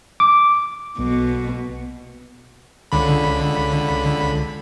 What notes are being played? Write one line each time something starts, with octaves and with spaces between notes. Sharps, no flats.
D6
B1 B2
C#2 D3 B5